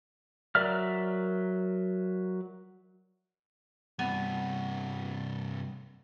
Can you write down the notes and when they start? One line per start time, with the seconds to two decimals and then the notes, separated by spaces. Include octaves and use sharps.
0.55 F#3 A#4 D5 E5 F6
3.99 G2 C3 B3